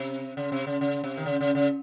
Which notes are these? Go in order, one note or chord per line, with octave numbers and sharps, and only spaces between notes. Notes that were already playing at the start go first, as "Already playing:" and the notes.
Already playing: C3
C#3
C3
C#3
C#3
C3
D#3
C#3
C#3
C#3